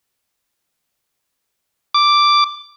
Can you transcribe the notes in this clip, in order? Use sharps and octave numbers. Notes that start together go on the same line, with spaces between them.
D6